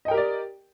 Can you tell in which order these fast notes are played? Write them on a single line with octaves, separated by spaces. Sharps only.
D#5 G5 A#4 G4 D5